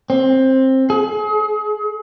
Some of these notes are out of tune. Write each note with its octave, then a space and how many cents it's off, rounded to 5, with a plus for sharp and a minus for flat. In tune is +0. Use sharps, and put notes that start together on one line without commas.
C4 +15
G#4 +35